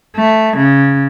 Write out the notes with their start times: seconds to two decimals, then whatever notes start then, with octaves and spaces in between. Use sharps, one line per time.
0.16 A3
0.57 C#3